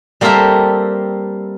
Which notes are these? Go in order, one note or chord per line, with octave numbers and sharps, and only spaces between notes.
G3 A#3 C4 A4 A#4 E5